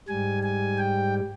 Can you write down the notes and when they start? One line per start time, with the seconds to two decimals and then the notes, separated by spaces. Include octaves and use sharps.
0.08 G#2 G3 G#5
0.43 G#5
0.78 G5